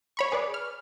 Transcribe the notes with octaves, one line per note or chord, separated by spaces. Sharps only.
C#5 B5 C#6
G#4 B4 D5
F6